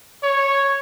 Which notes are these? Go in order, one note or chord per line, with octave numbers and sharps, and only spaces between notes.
C#5